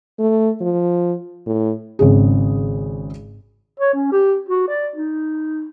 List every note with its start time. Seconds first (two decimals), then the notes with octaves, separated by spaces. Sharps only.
0.19 A3
0.61 F3
1.47 A2
1.99 G#1 C#3 G#4
3.80 C#5
3.93 C#4
4.12 G4
4.49 F#4
4.68 D5
4.96 D#4